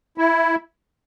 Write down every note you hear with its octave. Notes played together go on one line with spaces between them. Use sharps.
E4